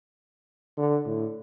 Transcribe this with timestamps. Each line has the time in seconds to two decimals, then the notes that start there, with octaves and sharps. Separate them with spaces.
0.77 D3
1.06 A2